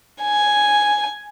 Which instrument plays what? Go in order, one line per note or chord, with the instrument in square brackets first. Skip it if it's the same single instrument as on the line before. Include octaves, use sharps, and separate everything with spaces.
[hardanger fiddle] G#5